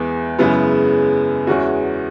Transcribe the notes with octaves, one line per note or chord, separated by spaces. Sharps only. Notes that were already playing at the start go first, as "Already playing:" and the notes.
Already playing: E2 E3 G#3 B3
F#2 C#3 G#3 B3 E4
E2 E3 G#3 C#4 F#4